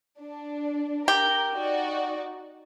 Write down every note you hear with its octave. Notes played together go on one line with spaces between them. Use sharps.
D4
G4 A#4
D#4 F#4 D5